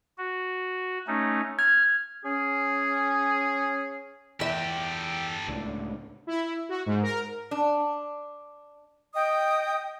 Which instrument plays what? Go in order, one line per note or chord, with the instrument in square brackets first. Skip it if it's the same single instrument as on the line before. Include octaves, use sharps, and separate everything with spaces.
[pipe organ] F#4
A3 C#4 D#4
[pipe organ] F6 [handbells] G#6
[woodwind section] C#4 G#4
[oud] E2 E5 [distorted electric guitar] G4 A4 [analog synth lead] G5
[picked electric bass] C#2 A2 [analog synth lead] D4
[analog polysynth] E4
F#4
G#2
A#4
[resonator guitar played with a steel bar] D4
[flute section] D#5 G5 D#6